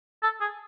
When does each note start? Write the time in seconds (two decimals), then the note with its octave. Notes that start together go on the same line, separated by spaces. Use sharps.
0.23 A4
0.41 G#4